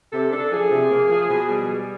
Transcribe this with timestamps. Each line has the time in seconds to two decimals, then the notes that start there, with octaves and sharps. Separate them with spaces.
0.13 C3 A4
0.32 D4 A4
0.52 F3 G#4
0.71 C3
0.91 A#3
1.10 F3
1.30 B2
1.49 G3
1.69 G3